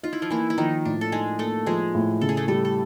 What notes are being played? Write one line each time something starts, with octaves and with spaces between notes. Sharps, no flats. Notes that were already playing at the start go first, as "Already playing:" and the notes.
D#4 F4
E4
F3 F4
E3 A#3 E4
E4
D#3 F3 D#4
A2 D4
A4
G#3 D#4 G#4
A3 A#3 A4
F3 G#3 G#4
A2
C#3 A4
G#4
A3 A4
G3 A3 A4
A4